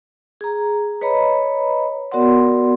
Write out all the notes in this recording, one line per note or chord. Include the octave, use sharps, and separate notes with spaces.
G#4 A#5
B4 C#5 D#5 A#5 B5
B3 F#4 A#4 D5 F#5 C6